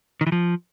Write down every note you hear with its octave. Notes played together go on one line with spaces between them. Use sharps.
D#3
E3
F3